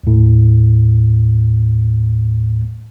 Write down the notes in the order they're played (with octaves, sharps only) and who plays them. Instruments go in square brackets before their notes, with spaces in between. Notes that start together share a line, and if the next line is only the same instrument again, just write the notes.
[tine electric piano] D#2 A2